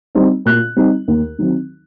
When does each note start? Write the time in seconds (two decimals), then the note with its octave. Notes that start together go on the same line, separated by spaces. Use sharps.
0.15 G3 C4 D#4
0.46 A#2 F#6
0.76 G3 C4 D#4
1.08 D#2
1.38 D#3 F#3 C4 D#4